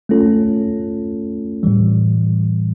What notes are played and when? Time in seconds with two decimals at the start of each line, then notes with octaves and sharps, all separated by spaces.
0.09 A3 C#4 F4 A4
1.63 A2 E3 G3